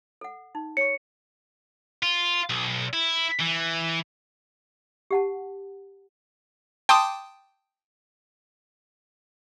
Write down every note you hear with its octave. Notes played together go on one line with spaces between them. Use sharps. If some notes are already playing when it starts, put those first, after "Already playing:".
A4 F#5
D#4
C#5 C#6 C#7
F4
B1
E4
E3
G4 F#5 A5
G5 A5 C6 D6 D#6